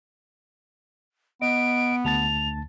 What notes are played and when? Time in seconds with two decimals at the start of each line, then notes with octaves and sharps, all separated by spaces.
1.42 B3 D#5 D7
2.05 D2 A5 A6 F7